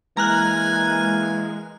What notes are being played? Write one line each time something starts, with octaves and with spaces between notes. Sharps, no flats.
E3 G#3 A#3 G#5 A#5 F6 F#6